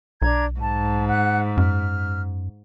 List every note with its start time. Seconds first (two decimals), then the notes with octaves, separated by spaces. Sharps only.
0.22 B1 D4 A#5 G#6
0.59 G#2 A5
1.08 F#5 F#6
1.57 F#2 F6